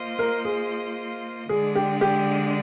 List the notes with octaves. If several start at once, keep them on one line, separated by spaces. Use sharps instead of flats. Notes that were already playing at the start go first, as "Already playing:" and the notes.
Already playing: A#3 F4 C5 D#5
A#4
G#4
D3 G#3 D4 G#4
G4
G4